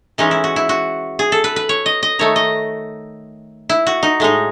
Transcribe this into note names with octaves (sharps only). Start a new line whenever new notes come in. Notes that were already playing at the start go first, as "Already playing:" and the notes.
E3 G#3 C#4 D#4
E4
F#4
E4
F#4
G#4
A4
B4
B4
C#5
D#5
D#5
D#3 A3 D#4 C#5
D#5
E4
F#4
D#4
A2 G#3 D#4